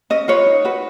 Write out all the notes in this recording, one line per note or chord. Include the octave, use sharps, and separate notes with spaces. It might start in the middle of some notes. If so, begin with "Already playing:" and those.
C#4 D#5
F4 B4 C#5
D#4
F#4 B4